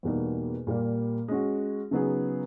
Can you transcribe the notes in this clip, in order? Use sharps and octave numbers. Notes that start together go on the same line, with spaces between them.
E2 B2 G3 A#3 D#4
A#2 G3 A#3
G#3 C#4 F#4
C#3 F#3 B3 D#4 G#4